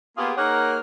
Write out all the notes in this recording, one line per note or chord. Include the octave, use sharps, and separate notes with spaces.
A#3 B3 F4 G4 G#4
A#3 D#4 G#4 A#4 C#5 F#5